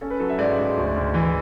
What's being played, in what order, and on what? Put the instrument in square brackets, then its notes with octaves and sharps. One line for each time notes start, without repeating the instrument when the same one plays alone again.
[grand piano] C#4 A4
B4
F#3 A4
E5
G#2 D5
G#2
D2
D2
E3